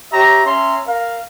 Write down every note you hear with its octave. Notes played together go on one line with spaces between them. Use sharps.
G4 C#5 E5 A#5
C#4 E5 A#5 C6
A#4 F5